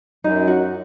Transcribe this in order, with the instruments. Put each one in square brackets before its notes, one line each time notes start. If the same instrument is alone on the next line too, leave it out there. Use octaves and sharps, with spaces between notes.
[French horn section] F#2 [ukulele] D#4
[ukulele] F#4